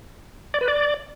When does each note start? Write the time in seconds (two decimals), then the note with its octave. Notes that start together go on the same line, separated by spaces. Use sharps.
0.54 D5
0.61 B4
0.68 D5